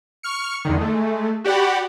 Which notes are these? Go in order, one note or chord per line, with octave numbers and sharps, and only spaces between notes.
C#6 F6 C#7
E2 D3 D#3
G#3 A3
F#4 G4 D5 F#5 B5